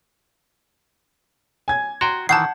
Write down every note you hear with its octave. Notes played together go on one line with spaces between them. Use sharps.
G#5 G#6
F#4 G5 A#5 C6
D#3 E3 F#5 A5 G6 C7